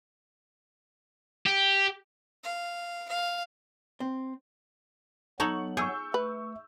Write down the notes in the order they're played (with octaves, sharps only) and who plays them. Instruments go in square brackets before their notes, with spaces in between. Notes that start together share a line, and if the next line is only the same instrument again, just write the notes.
[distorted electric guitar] G4
[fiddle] F5
F5
[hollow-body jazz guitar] C4
[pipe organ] F#3 B3 [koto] D#4 A4 C#5 [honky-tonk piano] C#6 F#7
[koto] G#4 [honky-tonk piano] C#6 E6 G6
[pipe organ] A3 [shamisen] B4